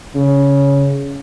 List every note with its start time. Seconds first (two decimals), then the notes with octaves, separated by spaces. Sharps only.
0.16 C#3